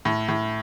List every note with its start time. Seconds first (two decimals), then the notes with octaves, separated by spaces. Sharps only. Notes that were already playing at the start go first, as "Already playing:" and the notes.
0.05 A2
0.28 A2